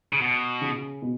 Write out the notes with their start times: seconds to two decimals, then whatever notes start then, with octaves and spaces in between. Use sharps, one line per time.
0.13 C#3
0.21 B2
0.61 C#3 C#4
1.02 B2